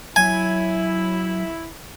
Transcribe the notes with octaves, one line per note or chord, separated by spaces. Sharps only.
F#3 E4 G#5